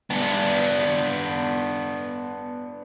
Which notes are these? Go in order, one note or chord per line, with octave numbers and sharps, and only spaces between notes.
B3 D4